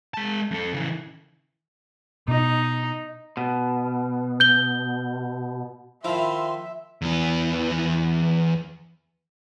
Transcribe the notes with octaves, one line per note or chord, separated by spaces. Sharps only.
G#3 A5
F2 A4
C#3 E3
B2 D#4
B2
G6 G7
D#3 F3 E4 E5 F5 C6
E2 E3